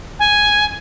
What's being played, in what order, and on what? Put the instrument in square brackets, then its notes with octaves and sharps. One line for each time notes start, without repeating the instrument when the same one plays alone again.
[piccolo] G#5